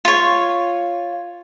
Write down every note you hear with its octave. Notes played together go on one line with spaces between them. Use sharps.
F4 C#5